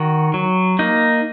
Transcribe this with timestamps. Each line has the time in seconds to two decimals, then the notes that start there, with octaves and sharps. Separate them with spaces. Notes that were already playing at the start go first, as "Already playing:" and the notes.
Already playing: D#3 F#4
0.34 F#3
0.79 A#3 D#4